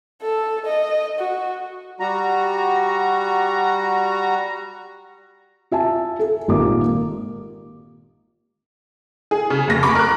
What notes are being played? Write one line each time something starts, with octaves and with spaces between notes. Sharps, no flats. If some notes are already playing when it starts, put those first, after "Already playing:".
A4
D#5
F#4
G3 F#4 A#5
F4 E5 G#5 A5
A4
G#1 A#2 A#3 G4 D6
G#4
C#3
F1 D#2 A#6
B5 C#6 D6
A#4 F#6